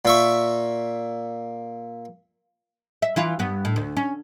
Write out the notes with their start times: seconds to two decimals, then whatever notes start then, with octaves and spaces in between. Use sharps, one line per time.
0.05 A#2 E5 C#6
3.02 E5
3.16 E3 E4 F4
3.39 G2 B3
3.65 A2
3.76 D2
3.97 C#4